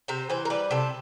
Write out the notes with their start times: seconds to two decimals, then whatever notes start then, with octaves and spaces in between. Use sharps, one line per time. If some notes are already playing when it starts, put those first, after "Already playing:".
0.08 C3 C5
0.30 E3 C5
0.45 A#4
0.50 G3 B4
0.71 C3 A4